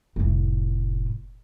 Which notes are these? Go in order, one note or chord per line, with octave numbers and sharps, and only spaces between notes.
F1 A2